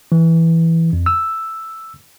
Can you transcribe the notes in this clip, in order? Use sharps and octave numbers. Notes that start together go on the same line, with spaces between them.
E3
F2
E6